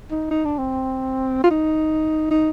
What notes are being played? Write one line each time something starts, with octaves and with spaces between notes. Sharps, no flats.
D#4
D#4
D4
C4
F4
D#4
D#4